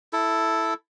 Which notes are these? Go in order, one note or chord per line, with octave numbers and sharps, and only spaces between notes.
E4 A4